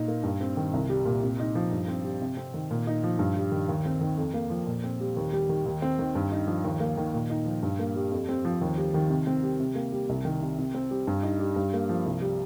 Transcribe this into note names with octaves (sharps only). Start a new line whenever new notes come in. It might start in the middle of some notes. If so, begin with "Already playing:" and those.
Already playing: A#2 D#4
A#3
G2
C4
D#3
C2
G3
A#2
C3
D#4
F3
G2
C4
G3
C3
C4
D#3
A#2
D#4
F3
G2
G3
D#3
D#2
C4
D#3
F2
A#3
F3
A#2
C4
G3
D#2
G3
D#3
D#2
C4
D#3
G2
D#4
F3
D#2
A#3
D#3
A#2
D#4
F3
G2
A#3
G3
F2
C4
F3
D#2
G3
D#3
C3
C4
G3
C3
A#3
G3
C2
D#3
C3
C3
C4
G3
G2
D#4
G3
G2
A#3
F3
C2
G3